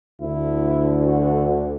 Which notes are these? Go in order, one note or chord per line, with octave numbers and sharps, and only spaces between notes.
D2 D3 E4
F#4